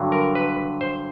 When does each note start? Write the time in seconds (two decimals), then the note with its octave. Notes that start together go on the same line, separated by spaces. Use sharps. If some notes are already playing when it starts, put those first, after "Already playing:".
Already playing: G2 D3 F#3
0.12 A#4
0.35 B4
0.81 C5